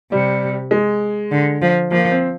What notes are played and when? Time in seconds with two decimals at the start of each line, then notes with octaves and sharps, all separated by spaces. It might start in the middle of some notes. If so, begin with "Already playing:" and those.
0.12 C3 G3
0.71 G#3
1.31 D3
1.62 F3
1.91 F3 A#3
2.12 C4